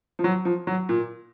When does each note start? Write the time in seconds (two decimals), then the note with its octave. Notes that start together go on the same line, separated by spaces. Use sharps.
0.19 F3
0.24 F#3
0.45 F3
0.67 F#3
0.89 A#2